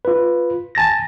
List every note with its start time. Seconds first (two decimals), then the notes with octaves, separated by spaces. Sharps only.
0.05 F4 B4
0.75 G#5 A5 A6 A#6